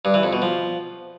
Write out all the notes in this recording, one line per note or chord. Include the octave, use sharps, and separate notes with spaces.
G2
E3
F2
B2
F3